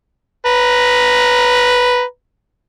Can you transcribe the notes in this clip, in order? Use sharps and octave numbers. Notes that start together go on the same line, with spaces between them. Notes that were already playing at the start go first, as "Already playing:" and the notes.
B4 A#5